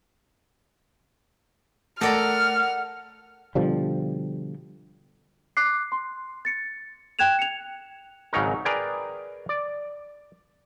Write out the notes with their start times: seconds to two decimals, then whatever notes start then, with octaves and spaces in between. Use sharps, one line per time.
2.01 A3 A4 A#4 D5 F#5 A#5 F6
3.55 B2 D3 F3 G3
5.57 D6 F#6 C7
5.92 C6
6.45 A6 C#7
7.19 G5 F#6 G#6 E7 F7
7.39 C#7 F7
8.33 G#1 C#3 F#3 C#4 D#4 A#4
8.65 G#4 A#4 B4 D5 G5 G#5
9.49 D5